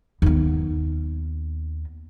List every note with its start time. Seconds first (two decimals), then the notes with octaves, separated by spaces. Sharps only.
0.22 D#2 B3